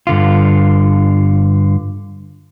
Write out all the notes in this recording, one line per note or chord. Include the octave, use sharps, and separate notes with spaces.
G2 D3 F4